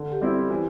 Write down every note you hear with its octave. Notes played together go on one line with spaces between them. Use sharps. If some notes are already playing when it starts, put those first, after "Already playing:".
Already playing: D3
G4
G3 C4 E4
E3